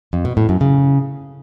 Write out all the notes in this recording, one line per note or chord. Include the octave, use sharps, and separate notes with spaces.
F2
B2
A2
F#2
C#3